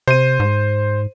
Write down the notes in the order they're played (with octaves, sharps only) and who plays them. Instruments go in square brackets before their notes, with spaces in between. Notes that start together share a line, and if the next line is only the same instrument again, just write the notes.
[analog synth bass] C3 [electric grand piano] C5 D#7
[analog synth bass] G#2